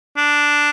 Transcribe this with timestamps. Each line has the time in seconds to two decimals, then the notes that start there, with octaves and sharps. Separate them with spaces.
0.17 D4